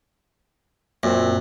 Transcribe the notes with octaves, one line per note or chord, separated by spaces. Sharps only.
F#2 A#2 C4